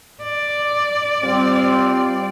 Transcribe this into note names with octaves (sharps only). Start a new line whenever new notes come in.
D5
G3 C4 F4